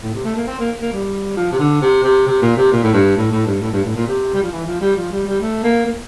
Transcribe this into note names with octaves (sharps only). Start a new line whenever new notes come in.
A2
C3
A3
A#3
C4
A#3
A#3
G3
F3
C3
D3
C3
C3
C3
A#2
C3
A#2
A2
G2
A2
A2
G2
A2
G2
A2
A#2
C3
G3
F3
E3
F3
G3
F3
G3
G3
A3
A#3
A#3